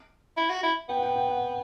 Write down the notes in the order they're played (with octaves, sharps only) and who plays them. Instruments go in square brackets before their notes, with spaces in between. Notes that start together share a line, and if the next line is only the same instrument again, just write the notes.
[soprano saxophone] E4
F#4
E4
[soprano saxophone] B3 [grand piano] G5
[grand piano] F#5
G5
G5
F#5